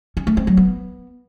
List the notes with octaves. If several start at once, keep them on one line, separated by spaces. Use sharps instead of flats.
C#4
A3
C4
F#3
B3